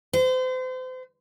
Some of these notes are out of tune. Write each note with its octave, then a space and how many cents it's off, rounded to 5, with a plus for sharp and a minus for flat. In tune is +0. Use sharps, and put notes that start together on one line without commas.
C5 -35